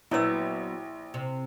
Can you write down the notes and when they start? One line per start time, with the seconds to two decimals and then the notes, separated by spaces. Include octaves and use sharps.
0.11 A#1 F#3 B3 E4 C#5 E6
1.14 C3